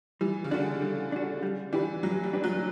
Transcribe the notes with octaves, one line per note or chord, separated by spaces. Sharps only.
E3 G3
C#3
D3 D4 F#4
G3
D4 F#4
G3
E3 D4 G4 B4
F#3 G3
G3
D4 G4 B4
F#3